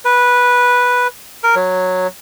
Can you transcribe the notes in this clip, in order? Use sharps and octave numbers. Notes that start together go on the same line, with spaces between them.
B4
A#4
F#3